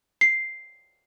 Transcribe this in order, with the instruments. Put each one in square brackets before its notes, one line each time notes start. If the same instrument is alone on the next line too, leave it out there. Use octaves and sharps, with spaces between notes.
[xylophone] C7